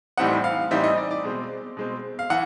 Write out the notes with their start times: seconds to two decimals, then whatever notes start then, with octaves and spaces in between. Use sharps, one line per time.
0.17 A2 E3 G3 C4 D#4 F#5
0.44 F5
0.71 A2 E3 G3 C4 D#4 E5
0.84 D#5
0.97 D5
1.11 D5
1.24 B2 G#3 C4
1.77 B2 G#3 C4
2.19 F5
2.30 E3 F#5